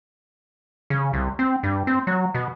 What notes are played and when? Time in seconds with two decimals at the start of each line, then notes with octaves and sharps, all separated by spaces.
0.90 C#3
1.13 C2
1.39 C4
1.63 G2
1.87 C4
2.07 F#3
2.34 B2